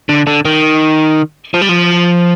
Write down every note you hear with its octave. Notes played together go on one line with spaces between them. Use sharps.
D3
D3
D#3
F3
G3
F3